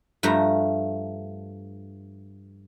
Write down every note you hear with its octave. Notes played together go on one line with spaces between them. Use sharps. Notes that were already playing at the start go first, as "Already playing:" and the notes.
G2 F3 A3 A#5